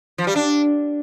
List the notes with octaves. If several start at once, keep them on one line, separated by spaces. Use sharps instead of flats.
F3
G3
D4